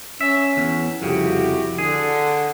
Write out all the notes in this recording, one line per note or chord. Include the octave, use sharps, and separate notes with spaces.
C#4 E5
E2
C2 F2 C#3 E4 F#4 G4
D3 G#4